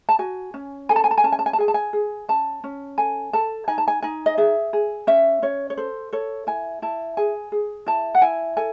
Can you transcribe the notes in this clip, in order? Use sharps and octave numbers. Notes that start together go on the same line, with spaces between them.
A5
F#4 G#5
C#4
A4 G#5
A5
G#5
A5
G#5
C#4 A5
G#5
A5
G#5
A5
G#4 G#5
A5
G#5
G#4
C#4 A5
C#4
A4 G#5
A4 A5
D#4 G#5
A5
G#5
D#4 G#5
D#5
G#4 E5
G#4
C#4 E5
C#4 C#5
C#5
A4 C5
A4 C#5
E4 G#5
E4 A5
G#4 G#5
G#4
E4 A5
F#5
E4 G#5
A4 G#5